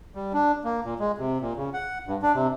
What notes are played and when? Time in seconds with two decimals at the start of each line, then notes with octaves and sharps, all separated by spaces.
0.15 G3
0.33 D4
0.64 A#3
0.85 A#2
0.99 G#3
1.18 C3
1.40 A#2
1.57 C#3
1.73 F#5
2.07 G2
2.22 D4
2.34 C3